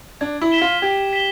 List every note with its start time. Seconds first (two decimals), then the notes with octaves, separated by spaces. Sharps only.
0.21 D4 G#6
0.41 E4
0.52 B6 E7 G7
0.62 F4
0.82 G4 G#6
1.13 B6 E7 G7